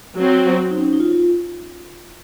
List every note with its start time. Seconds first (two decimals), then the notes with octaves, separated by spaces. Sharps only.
0.18 F#3 C4 F#4
0.71 D#4
0.77 C#4
0.93 D#4
1.00 F4
1.12 F4